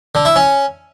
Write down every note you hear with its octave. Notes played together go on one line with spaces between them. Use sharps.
D3
E4
C#4